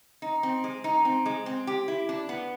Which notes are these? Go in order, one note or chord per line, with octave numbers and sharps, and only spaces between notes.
D#4
C4
G#3
D#4
C4
G#3
C4
G4
E4
D4
B3